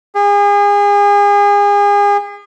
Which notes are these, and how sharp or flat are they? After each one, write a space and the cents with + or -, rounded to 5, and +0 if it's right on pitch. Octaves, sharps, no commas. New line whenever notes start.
G#4 -35